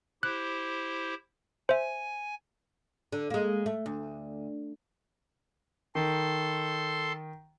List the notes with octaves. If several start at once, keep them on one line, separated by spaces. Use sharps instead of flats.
E4 G4 C5 F#6
C5 E5 G#5
D3
G#3 A#3
A3
D2
D#3 A4 C6